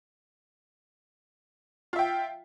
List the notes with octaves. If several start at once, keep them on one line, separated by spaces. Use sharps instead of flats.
F4 E5 G5